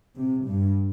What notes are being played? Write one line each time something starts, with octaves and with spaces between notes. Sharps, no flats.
C3
G2